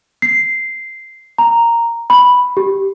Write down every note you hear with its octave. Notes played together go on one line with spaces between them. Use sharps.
C7
A#5
B5
G4